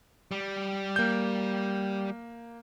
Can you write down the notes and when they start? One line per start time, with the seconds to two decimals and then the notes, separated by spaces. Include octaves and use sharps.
0.31 G3
0.96 A#3 G6